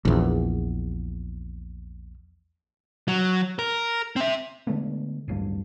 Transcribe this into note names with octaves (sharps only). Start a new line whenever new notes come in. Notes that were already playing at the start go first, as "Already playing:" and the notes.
A#1 E2
F#3
A#4
C4 E5
D3 G#3 A3 B3
D1 A1 G2 A#3